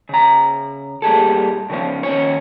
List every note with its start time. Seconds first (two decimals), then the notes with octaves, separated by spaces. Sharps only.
0.09 C#3 A#5
1.02 A#2 G3 G#4 A4
1.70 C#3 F3 C#4
2.03 D#2 C#4 C#5